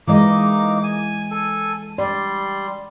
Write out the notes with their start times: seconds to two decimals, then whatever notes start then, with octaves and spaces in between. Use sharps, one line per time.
0.08 E3 G#3 A#3 D#4 D#5 D6
0.84 G#5
1.31 A4 G#5
1.98 G3 D5 C6